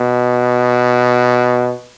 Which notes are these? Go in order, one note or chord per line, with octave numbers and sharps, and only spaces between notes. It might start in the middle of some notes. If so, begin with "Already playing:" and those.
Already playing: B2